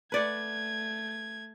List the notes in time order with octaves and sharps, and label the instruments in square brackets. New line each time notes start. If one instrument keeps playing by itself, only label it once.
[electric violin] A3 G#6 [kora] B4 D5 F#5